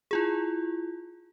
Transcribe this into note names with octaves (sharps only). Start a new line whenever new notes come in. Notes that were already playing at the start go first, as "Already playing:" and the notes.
E4 F4 G#4